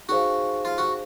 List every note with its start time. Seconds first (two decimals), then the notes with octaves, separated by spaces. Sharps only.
0.09 D#4 F#4 G#4 C5 F5
0.65 F4
0.78 F#4